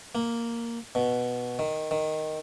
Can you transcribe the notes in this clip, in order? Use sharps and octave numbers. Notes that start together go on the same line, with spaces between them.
A#3
B2
D#3
D#3